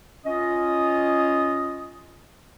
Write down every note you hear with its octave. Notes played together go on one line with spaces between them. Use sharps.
C#4 F4 D#5 D#6